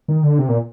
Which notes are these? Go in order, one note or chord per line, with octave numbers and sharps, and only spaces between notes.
D#3
D3
C3
A#2